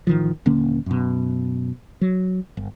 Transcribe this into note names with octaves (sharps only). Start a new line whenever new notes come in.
A1 D#3 F3
D#1 D3 A#3 C#4
F#2 B2
F#3
G1